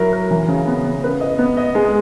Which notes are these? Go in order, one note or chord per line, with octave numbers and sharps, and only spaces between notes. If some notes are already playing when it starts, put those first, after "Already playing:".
Already playing: F#3 E4 A#4
A#4
E3
C#3
B3
B3
B4
D#5
B3
D#5
G#3